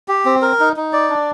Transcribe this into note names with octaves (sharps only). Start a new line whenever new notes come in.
G4
C4
A#4
D#4
D#4
D5
D4